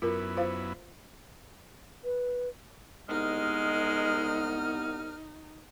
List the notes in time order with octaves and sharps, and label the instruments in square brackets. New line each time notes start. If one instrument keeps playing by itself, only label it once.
[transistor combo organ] F#2 B3 E4 [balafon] F4 A#4
[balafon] F4 C5 F5
[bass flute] B4
[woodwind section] C2 B3 F6 [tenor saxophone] G#3 [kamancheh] D#4